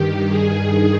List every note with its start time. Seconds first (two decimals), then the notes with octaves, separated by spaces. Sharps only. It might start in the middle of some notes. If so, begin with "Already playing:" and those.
Already playing: G2 D#3 G4
0.29 G#4